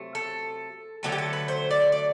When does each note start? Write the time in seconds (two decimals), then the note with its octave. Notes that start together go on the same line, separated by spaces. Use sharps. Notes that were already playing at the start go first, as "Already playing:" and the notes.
Already playing: C3 F#3 A3
0.15 A4
1.03 D3 F#3 A3 A4
1.12 G4
1.18 A4
1.33 B4
1.48 C5
1.71 D5
1.92 D5